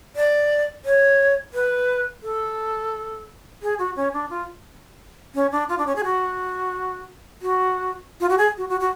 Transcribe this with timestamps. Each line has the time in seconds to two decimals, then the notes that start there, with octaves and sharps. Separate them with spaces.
0.16 D5
0.85 C#5
1.54 B4
2.23 A4
3.62 G#4
3.79 F#4
3.96 C#4
4.13 D4
4.30 F4
5.35 C#4
5.52 D4
5.69 F4
5.78 D4
5.87 C#4
5.96 G#4
6.04 F#4
7.42 F#4
8.20 F4
8.29 F#4
8.38 G#4
8.57 F#4
8.69 F#4
8.80 F#4